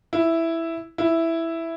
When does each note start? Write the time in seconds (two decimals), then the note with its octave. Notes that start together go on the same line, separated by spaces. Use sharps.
0.13 E4
0.98 E4